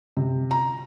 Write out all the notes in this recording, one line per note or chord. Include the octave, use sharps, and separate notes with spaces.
C3
A#5